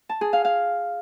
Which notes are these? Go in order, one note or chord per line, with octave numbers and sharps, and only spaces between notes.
A5
G#4
F5
F5